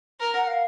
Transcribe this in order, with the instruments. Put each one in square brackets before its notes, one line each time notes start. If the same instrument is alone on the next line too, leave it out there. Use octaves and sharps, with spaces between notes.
[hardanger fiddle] A#4
[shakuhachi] F#5
F5